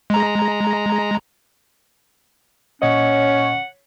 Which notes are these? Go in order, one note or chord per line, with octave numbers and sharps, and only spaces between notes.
G#3 A#5
A#2 C#4 C#5 D#5 F#5